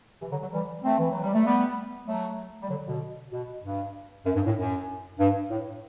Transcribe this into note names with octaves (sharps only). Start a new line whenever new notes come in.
C3 E3
D3 F#3
D3 F#3
E3 G3
A3 C4
E3
F#3
G3
A3
G3 B3
F#3 A3
G3
D3 F#3
B2 D3
B2
G2
F#2
G2
A2
F#2
G2
A2